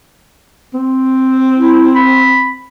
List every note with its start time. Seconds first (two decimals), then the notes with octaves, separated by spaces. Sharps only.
0.74 C4
1.56 E4
1.95 B5